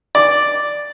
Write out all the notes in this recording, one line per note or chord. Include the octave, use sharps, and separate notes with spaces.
D5